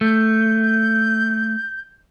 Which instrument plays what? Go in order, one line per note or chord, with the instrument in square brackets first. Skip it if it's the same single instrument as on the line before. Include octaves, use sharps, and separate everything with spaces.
[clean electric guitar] A3 [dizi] G6